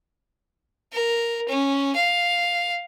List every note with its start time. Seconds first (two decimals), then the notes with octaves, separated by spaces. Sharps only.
0.93 A#4
1.48 C#4
1.96 F5